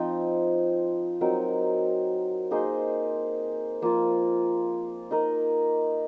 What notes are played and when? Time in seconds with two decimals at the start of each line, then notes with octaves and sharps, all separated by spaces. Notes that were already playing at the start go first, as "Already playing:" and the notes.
Already playing: F3 C4 D#4
1.21 F#3 C4 D#4 A#4
2.51 A#3 D#4 G#4 C5
3.82 F3 A#3 F4
5.11 D#4 A#4 D#5